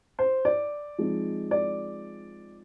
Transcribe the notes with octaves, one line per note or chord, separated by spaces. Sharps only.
C5
D5
F3 G#3 C4 D#4
D5